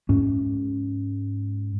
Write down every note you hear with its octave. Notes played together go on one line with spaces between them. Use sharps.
G#2 C#4